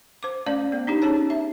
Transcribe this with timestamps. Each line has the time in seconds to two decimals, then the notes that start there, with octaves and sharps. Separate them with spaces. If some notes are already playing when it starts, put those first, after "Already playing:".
0.23 C5 D6
0.46 A3 C#4 D5 F5
0.72 B3
0.87 D4 D#4 G4
1.02 C#4 G#4 C#5 A5
1.30 E5